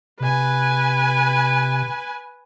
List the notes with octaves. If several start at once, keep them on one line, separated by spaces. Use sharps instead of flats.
C3 B4 G#5